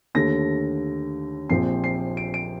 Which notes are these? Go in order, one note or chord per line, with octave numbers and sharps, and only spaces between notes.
D#2 D3 A3 A#6
A#1 A#2 F3 C4 C7
C7
D7
D7